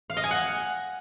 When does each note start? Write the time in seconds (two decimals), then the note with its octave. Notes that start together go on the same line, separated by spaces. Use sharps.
0.10 F5
0.17 D#5
0.24 G#5
0.31 F#5